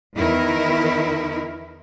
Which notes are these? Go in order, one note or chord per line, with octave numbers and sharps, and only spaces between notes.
E2 D#3 E4 A#4